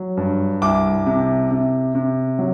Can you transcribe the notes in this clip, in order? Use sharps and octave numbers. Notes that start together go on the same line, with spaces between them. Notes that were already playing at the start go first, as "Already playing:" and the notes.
Already playing: F#3
G2
C2 D6
C3
C3
C3
F#3